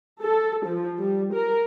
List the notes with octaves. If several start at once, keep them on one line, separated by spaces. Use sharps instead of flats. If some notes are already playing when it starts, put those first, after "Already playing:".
A4
F3
G3
A#4